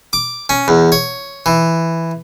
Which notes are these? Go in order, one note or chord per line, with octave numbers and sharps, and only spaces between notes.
D6
C#4
E2
C#5
E3